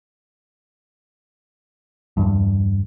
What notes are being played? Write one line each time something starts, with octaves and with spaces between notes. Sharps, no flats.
E2 G2